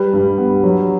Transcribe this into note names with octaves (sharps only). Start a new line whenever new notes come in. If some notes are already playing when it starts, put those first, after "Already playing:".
Already playing: G3 B4
G2
B3
F#3